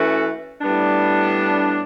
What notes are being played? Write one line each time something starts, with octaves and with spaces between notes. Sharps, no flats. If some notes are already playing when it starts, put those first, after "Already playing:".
Already playing: E3 A3 C#4 F#4
A2 G3 B3 D4